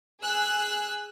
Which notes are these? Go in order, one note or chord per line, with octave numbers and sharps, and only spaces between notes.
G#4 E6 F#6